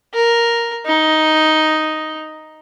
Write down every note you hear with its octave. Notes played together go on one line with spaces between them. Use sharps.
A#4
D#4